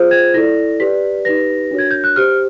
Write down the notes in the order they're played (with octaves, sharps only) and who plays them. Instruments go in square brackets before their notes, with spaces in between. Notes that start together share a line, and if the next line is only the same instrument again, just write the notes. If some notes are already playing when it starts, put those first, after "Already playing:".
Already playing: [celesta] F4 G#4 C5
G#6
E4 A4 D5 A#6
G4 B4 D5 B6
D#4 G4 B4 A#6
D4 F#4 A#4 C#5
G#6
G6
F#6
G4 C5 F6